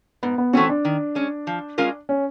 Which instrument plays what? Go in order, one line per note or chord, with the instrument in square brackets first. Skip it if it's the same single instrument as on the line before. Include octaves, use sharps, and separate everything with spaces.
[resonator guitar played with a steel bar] G#2 [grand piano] B3
[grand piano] B3
[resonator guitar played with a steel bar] E3 A3 C#4 F#4 [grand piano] C4
[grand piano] D4
[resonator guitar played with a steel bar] D#3
G#3 C#4
F3
G#3 C#4 F4 A#4
[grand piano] C#4